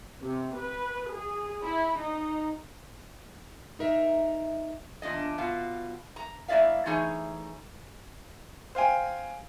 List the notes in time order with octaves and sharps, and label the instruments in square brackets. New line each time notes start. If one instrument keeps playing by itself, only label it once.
[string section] C3
B4
G#4
E4
D#4
[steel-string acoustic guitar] D#4 A#4 E5
[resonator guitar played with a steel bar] E2 A#2 D4 D#5
B2 F4
A#5
F#3 A#3 E4 D5 E5 F5
E3 A3 D#4 G#4 C#5
[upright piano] C5 F5 G5 G#5